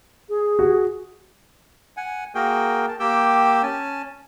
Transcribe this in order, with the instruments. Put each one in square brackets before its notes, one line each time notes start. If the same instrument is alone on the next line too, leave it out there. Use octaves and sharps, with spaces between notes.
[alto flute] G#4
[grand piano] F#4
[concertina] F#5 G#5
A#3 F#4 G#4 A#4 G5
A5
A#3 G4 G5 D6 E6
C#4 G#5 A5